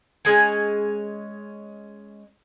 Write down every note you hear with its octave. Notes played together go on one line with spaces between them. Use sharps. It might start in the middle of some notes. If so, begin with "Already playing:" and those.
G#3 C#4 G#5